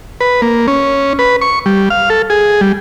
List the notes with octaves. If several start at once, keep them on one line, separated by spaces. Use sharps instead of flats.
B4
A#3
C#4
B4
C#6
G3
F5
A4
G#4
G3